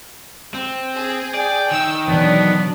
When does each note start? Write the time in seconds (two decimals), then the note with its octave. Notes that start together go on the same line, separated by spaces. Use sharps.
0.54 C4
0.96 G#4
1.34 D5 G5
1.71 D#3 E6
2.08 B2 E3 F#3 B3 D4